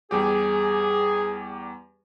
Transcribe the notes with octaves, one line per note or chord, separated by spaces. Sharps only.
E2 G3 G4 G#4